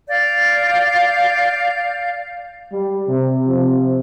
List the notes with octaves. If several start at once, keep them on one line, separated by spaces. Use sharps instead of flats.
D5 F5 G6
G3
C3
C3 F3